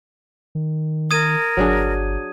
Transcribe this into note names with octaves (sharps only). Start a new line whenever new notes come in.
D#3
A#4 D#6 G#6 D#7
G1 F#3 D4 G#4